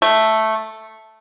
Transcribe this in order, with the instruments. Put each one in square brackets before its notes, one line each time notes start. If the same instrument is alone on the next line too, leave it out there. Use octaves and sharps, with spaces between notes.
[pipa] A3